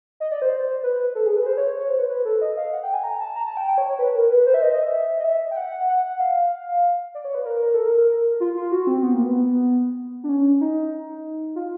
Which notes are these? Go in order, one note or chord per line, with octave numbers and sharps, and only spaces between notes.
D#5
D5
C5
B4
A4
G#4
B4
C5
C#5
C#5
C#5
C5
B4
B4
A4
D#5
F5
F#5
G5
G#5
A#5
A5
A#5
A5
G5
G5
C#5
C#5
B4
A#4
B4
C5
E5
D#5
D#5
E5
D#5
E5
G5
F#5
F#5
F#5
F5
D5
C#5
B4
A#4
A#4
A4
A#4
F4
F4
F#4
C4
B3
A#3
B3
D4
C#4
D#4
F4